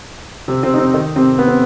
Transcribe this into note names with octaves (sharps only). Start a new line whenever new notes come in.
C3 C4
C3 C4
D#4
C3 C4
D#3 D#4
C3 C4
B3
C4